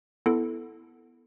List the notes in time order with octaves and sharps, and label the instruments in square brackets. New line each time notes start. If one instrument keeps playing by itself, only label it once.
[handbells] B3 E4 A4